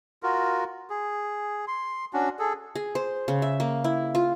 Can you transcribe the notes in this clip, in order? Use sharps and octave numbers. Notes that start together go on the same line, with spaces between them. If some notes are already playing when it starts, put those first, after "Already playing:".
F4 F#4 A#4
G#4
C6
C#4 D4 F#4
G#4 A4
G#4
C5
C#3
E5
A#3
E4
F4